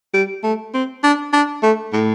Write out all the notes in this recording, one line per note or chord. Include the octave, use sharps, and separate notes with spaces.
G3
A3
C4
D4
D4
A3
A2